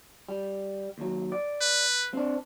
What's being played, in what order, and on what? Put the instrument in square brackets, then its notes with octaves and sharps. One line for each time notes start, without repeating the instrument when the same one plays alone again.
[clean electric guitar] G3
D#2 F#3
D5
[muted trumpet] B4
[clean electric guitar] C4 D4